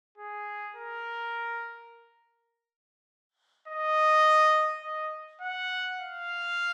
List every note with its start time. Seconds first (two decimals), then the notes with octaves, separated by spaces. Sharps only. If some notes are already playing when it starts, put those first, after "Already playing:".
0.18 G#4
0.76 A#4
3.68 D#5
4.84 D#5
5.41 F#5
6.01 F5